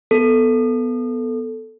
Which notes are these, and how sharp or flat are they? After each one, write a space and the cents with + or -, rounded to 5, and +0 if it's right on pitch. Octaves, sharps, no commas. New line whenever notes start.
B3 +0 A4 +0